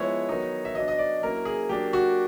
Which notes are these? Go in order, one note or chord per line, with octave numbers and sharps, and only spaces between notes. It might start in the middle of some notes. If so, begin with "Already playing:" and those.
Already playing: F3 G#3 B3 E4 C#5
D#3 F#3 B3 D#4
E5
F#3 B3 D4 D#5
D#5
D5
F#3 A#3 C#4 E4 A#4
G#4
F#3 A#3 D4 G4
F#4